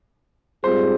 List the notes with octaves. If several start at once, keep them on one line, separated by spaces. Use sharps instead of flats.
G#2 G3 C4 F4 G#4 C5